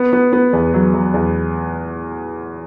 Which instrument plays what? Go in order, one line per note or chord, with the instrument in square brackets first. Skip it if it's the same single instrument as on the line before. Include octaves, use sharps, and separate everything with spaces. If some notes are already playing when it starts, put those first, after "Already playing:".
Already playing: [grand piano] B3
B3
B3
E2
F#3
F#3
E2